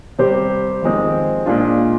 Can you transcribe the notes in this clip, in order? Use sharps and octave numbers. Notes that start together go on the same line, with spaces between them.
C3 G3 C4 G4 C5
F2 D#3 G#3 C4
A#2 G#3 D4 F4